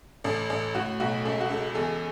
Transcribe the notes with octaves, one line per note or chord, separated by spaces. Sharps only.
A1 A4
A1 A4
A2 F#4
B1 F#4
C#2 A4
F#4
C#2 A4
E2 A4